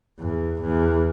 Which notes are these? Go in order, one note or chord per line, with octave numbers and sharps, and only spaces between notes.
E2
E2